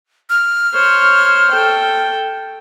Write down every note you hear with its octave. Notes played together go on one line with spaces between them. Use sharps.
F6
C5 C#5
A4 G5